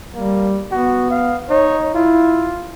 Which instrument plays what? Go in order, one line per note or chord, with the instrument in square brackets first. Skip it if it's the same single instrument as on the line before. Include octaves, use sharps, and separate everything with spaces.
[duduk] G3 [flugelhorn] A#3
[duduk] B3 [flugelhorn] F#4
[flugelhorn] F5
[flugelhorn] D#4 [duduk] C#5
[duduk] E4 [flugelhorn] F4